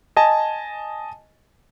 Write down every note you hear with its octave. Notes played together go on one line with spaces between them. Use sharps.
D#5 G#5 A5